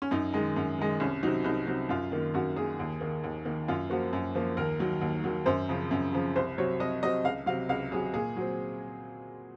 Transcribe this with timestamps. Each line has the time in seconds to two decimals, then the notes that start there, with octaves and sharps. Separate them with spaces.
0.02 C#4
0.11 F#2 D#4
0.34 D#3 G#3
0.56 F#2
0.78 D#3 G#3
1.00 C2 C#4
1.23 F#3 D#4
1.27 C3
1.44 C2 D#4
1.67 C3 F#3 D#4
1.89 F#2 F4
2.12 D#3 A#3
2.34 F#2 F#4
2.56 D#3 A#3 G#4
2.79 D#2
3.01 D#3 A#3
3.24 D#2
3.45 D#3 A#3
3.68 F#2 F4
3.90 F3 A#3 F#4
4.13 F#2
4.35 F3 A#3
4.57 D#2 A#4
4.80 D#3 F#3
5.01 D#2
5.24 D#3 F#3
5.46 F#2 C5
5.69 C#3 F3 C4
5.91 F#2
6.13 C#3 F3 C4
6.36 C2 C5
6.57 C3 F#3 C4 C#5
6.80 C2 D#5
7.03 C3 F#3 C4 D#5
7.24 C#2 F5
7.46 C3 F#3 F5
7.69 C#2 F5
7.92 C3 F#3 G#4
8.13 A#2 G#4
8.36 F#3 C4